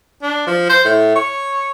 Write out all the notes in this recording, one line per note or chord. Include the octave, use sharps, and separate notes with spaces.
D4
F3
C5
A2
C#5